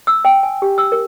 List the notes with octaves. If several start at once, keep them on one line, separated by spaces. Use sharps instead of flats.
E6
G5
G#5
G4
E6
A#4